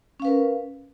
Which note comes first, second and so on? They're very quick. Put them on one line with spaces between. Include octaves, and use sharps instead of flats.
C#4 F5 B4 A#4